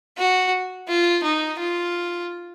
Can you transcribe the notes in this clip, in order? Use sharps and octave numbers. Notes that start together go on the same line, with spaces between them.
F#4
F4
D#4
F4